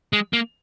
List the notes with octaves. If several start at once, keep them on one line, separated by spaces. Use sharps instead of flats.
G#3
A#3